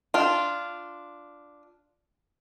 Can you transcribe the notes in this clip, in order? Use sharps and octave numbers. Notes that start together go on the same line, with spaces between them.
D4 F4